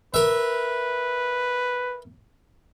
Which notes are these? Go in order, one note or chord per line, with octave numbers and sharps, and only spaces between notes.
A#4 B4 E5